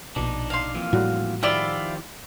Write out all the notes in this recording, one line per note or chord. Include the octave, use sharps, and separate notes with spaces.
A#1 B2 D4 D#4
F5 C6
F2 A#2 E3
A2 G3 F#4
D#3 F3 E4 F4 G4 D5